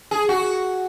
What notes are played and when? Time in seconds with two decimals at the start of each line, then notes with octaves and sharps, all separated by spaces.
0.11 G#4
0.29 F#4